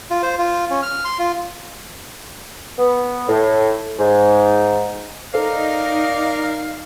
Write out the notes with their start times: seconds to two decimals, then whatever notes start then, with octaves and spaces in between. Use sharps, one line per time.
0.10 F4
0.23 C5
0.39 F4
0.71 C#4
0.82 F6
1.05 C6
1.19 F4
2.78 B3
3.29 A2
3.99 G#2
5.34 D#4 A4 A#4 C5 D5 F5 A#5